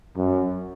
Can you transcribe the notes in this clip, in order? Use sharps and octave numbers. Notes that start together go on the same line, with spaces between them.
F#2